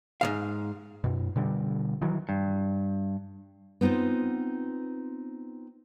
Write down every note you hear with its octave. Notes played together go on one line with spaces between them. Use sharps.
G#2 C#3 F5
F#2 B2
B2 D3 G3
D#3 E3 F#3
G2
B3 C4 D#4 F4 C5